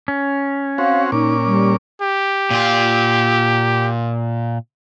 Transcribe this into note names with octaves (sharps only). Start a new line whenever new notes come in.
C#4
C4 F#4 C#5 F5
A#2 C#4 D#4 D6
G3
G4
A#2 F4